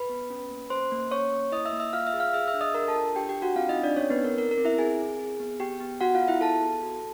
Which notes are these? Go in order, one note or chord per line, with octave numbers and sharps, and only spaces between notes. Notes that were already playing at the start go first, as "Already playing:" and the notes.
Already playing: B4 B5
B3
C#4
A#3
C#4 C5 C6
A#3
C#4 C#5 C#6
A#3
E4 D#5 D#6
E5 E6
A#3
E5 E6
F4 F5 F6
E5 E6
G#4
F5 F6
G#4 E5 E6
E5 E6
D4
D#5 D#6
D4 A#4 A#5
A4 A5
F4
D4 G4 G5
G4 G5
D4
F#4 F#5
C4 F4 F5
D#4 D#5
C4
D4 D5
C4 C#4 C#5
B3 B4
D#4
A#4
C4 A#4
A#4
C4
E4 E5
C4 G#4 G#5
C4
G#4
B3
B3 G4 G5
B3
B3 F#4 F#5
F4 F5
B3
E4 E5
G#4 A4 A5
B3
F#4